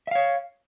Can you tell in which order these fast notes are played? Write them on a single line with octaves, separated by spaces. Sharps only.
E5 F5 C#5